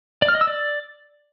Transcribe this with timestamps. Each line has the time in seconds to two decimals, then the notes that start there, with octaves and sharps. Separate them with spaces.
0.22 D5
0.28 F6
0.35 D#5
0.41 E6
0.47 D5